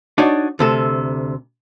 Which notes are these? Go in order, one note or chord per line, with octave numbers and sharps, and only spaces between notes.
D4 D#4 F#4 C#5 D5
D2 C3 A4